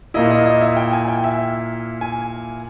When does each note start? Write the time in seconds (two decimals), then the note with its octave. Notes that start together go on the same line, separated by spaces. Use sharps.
0.14 A#2 A#3 E4 D#5
0.31 D#5
0.45 D#5
0.61 E5
0.77 G5
0.93 G#5
1.08 G5
1.24 E5
2.01 G#5